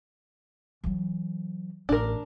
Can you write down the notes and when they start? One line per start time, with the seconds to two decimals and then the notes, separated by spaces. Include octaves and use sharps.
0.84 E3 F#3
1.89 A1 D4 A#4